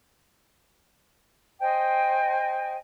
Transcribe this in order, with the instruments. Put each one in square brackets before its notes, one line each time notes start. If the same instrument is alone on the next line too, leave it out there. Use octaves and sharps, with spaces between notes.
[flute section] C5 D#5 G5 G#5